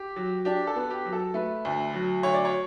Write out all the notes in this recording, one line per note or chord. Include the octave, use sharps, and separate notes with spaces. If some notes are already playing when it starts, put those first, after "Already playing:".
Already playing: G4
F#3
D4 G4
A4
B3
G4
F#3
A4
A3 B4
D2
F#3
D2 C#5
D5
C#5